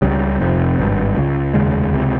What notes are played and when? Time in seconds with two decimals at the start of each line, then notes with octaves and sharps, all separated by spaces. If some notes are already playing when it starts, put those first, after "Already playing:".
0.02 C#2 C#3 G3
0.40 F1 F2 C3
0.78 G#1 G2
1.16 C#2 C#3
1.54 F1 D#2 C#3 G#3
1.93 C#2 C3